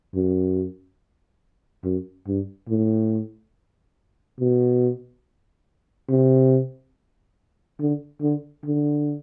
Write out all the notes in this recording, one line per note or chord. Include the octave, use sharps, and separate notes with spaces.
F#2
F#2
G2
A2
B2
C3
D3
D3
D3